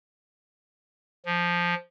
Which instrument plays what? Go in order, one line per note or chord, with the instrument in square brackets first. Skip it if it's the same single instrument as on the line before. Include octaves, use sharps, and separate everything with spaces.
[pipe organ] F3